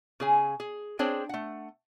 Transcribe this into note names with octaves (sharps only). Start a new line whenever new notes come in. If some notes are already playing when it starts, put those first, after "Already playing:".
C#3 G#4 G#5
G#4
C4 D4 G#4 C5 C#5 G5
A3 F#5